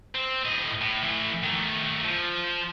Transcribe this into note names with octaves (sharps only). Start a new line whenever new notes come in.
C4
A2 D#5
A2
E3 A3
D#3 A3
F3